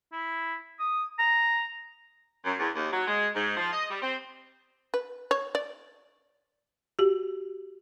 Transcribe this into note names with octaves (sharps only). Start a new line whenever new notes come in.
E4
D#6
A#5
F#2
E2
D#2
F#3
G#3
G#2
F3
D#5
G3
C4
B4
C#5
D5
F#4 G4